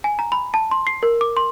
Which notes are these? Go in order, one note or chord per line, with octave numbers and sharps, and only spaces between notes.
G#5
A#5
B5
A5
C6
C7
A#4
D6
C6